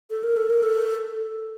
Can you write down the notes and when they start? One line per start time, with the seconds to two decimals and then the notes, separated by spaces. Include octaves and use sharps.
0.10 A4
0.23 A#4
0.37 A4
0.50 A#4
0.63 A4